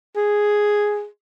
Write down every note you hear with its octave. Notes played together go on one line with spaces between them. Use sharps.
G#4